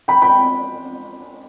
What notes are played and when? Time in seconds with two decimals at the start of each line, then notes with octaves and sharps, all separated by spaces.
0.08 G5 B5
0.22 G5 B5